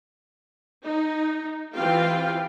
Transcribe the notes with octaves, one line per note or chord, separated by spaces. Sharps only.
D#4
E3 C4 F4 G4 F5 G5